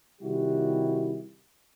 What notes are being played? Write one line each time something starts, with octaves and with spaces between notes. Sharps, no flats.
C3 D#3 G3 E4 F#4 G4